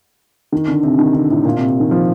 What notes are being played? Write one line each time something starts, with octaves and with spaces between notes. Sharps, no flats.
D#3
D3
C3
D#3
D3
A2
A#2
C3
D#3
F3